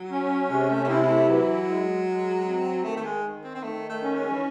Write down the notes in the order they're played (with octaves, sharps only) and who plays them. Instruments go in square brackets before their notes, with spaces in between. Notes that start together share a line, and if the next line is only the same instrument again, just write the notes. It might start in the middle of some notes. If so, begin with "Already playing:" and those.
Already playing: [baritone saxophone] F#3
[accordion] C#4
[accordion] C3 [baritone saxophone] G#3
[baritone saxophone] A3
A3
[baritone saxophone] C4 [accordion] E4
[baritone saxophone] G#3
A3
[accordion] E3 [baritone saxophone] F#3
[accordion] G#3
G#3
C4
[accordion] D#3 [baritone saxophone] A3
[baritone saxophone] A3
G#3
[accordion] D#3
[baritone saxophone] C4
C4
[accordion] D#3 [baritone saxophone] A3
[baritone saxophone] A3
[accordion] C#4
[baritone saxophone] G#3
E3